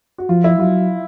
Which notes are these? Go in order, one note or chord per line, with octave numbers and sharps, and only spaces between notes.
F#4
F3 F4
E4
F#3 F4